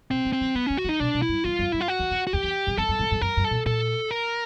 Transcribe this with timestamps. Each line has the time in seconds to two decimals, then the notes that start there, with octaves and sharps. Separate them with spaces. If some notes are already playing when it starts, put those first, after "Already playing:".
0.11 B2 C4
0.25 D#3
0.33 C4
0.41 E3
0.55 D#3 B3
0.67 D3 C#4
0.77 F#4
0.85 D#3
0.89 D#4
1.00 B2 D4
1.14 B2
1.22 E4
1.29 G2
1.44 F#2 F4
1.59 F#2
1.72 G2 E4
1.81 F4
1.88 F#4
1.99 E2
2.10 F2
2.27 F#4
2.33 E2 G4
2.43 E2
2.67 F#2
2.78 F2 A4
2.89 F#2
2.99 G#2
3.11 G#2
3.21 F#2 A#4
3.37 F#2
3.44 A4
3.51 A#2
3.66 A#2 A4
4.11 A#4